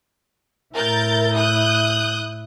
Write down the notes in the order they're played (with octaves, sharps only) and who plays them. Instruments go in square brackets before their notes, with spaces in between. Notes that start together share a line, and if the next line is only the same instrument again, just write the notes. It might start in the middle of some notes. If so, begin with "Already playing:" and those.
[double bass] A2 E4 [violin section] A#4 G6 A6
[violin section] D#6 F#6 G6